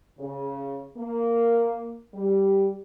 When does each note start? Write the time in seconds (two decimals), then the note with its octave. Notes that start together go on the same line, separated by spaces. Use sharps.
0.19 C#3
0.96 A#3
2.14 G3